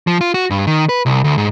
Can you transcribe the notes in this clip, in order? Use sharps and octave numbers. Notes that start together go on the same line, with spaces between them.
F3
F4
F#4
G2
D#3
B4
C2
D2
G#2